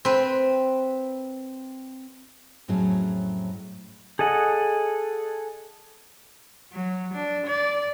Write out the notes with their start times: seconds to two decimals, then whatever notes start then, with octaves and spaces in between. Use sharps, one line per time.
0.05 C4 B4
2.68 F2 A2 F#3 C#4 G#4
4.19 G#4 A4 D#5 F#5
6.72 F#3
7.14 D4
7.47 D5